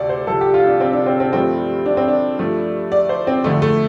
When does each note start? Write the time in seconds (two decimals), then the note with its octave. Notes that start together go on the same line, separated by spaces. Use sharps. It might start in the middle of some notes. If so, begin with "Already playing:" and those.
Already playing: D2 C3 A3 A4 D5
0.09 C5
0.27 C2 C3 F3 A4
0.41 G4
0.54 F4
0.67 D4
0.80 C4
0.93 D4
1.06 C4
1.20 C4
1.33 G2 F3 A3 C4
1.86 D4
1.97 C4
2.08 D4
2.39 G2 F3 A3
2.92 D5
3.09 C5
3.27 C4
3.44 F2 D3 A3
3.62 A3